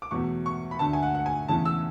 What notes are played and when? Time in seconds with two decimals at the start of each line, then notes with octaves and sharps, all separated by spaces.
0.02 D6
0.11 E2 B2 F#3 A3 C#6
0.46 C#6
0.71 B5
0.79 D2 D3 A3 A5
0.93 G#5
1.03 F#5
1.15 F#5
1.26 G#5
1.48 E2 C#3 E3 A3 A5
1.65 E6